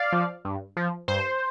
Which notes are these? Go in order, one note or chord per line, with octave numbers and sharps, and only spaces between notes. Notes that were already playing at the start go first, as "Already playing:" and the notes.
Already playing: D5 F5
F3
G2
F3
G2 C5